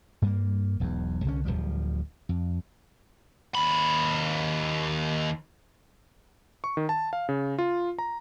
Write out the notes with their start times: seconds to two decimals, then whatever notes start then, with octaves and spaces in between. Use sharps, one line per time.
0.22 G2 G3 A#3
0.80 E1 B1 E2
1.25 C2 D3 C#4
1.45 D1 A#1 F3 G3
2.29 F2
3.55 D#2 B5
6.64 C#6
6.77 D#3
6.89 A5
7.13 F5
7.29 C#3
7.58 F4
7.99 A#5